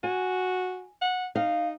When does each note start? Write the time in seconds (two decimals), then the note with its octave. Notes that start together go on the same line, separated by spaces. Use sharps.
0.04 F#4 G#5
1.02 F#5
1.35 D#4 F5